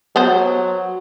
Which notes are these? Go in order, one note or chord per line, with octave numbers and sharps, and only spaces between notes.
F#3 B3 C5